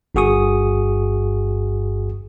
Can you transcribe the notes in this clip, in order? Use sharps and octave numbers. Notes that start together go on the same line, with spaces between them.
G1 G2 F#4 G#4 C#6 D#6